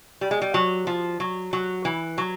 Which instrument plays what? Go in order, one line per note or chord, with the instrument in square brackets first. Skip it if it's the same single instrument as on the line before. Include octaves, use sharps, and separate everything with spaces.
[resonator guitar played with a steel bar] G3
G#3
G3
F#3
F3
F#3
F#3
E3
F#3